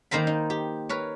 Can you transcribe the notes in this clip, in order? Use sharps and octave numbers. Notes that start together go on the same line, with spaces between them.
D#3 A#3 C5 A#5 B5
D#4
G4
A#4 B4 C#5